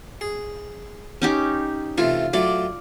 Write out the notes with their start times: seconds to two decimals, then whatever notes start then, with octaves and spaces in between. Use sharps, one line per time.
0.21 G#4
1.22 C#4 D#4 G4
1.98 C3 E3 A3 F4
2.33 F#3 A3 F4 D5